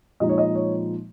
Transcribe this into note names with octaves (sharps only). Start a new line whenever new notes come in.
A#2 F3 G#3 D#4 D#5
C#5
D#5
C#5